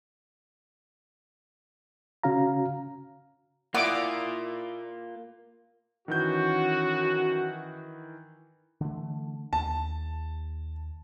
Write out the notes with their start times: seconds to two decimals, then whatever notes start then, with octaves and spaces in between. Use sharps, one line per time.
2.24 C#3 C#4 F#4 F5 A#5
3.75 A#3 E4 F4 D5 F#5 D6 D#6
6.08 F#2 D#3 E3 F#4 G6
8.81 D3 E3 A3
9.53 D#2 A5